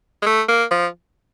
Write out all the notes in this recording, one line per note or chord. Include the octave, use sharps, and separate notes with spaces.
G#3
A3
A#3
F3